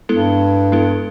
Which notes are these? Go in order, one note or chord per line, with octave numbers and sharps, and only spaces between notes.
G2 G#3 B3 E4 A4
G#3 B3 E4 A4